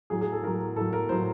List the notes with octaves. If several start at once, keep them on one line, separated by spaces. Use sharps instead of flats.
A2 F#3 G#4
G#4
A4
A2 F#3 A#4
A2 F#3 A4
A#4
A2 F#3 C5